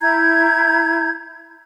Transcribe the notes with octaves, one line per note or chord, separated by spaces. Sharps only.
E4 A#5 G6 G#6